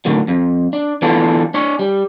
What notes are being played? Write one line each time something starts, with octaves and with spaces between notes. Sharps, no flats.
A2 D3 D#3 F#3
F2
D4
E3 B3 D4 F4 A4
D4 C#5
G3